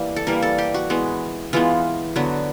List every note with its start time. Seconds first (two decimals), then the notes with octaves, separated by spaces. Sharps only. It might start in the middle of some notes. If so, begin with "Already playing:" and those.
Already playing: E3 G3 A#3
0.16 A4
0.27 E3 G3 A#3 A#4
0.42 A4
0.58 G4
0.74 F#4
0.90 E3 G#3 B3
1.53 E3 G#3 B3 F4
2.16 D3 F#3 B3